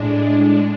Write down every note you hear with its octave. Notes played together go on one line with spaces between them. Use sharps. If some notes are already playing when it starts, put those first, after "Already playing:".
Already playing: A2 G#3 D4